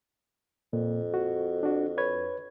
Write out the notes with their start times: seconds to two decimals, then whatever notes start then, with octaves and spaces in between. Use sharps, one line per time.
0.73 F2 A#2
1.14 F#4
1.63 D4 F#4
1.98 B4 C#5 G#6